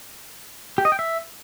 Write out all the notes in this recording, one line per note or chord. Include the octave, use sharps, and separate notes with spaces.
G4
D#5
G5
E5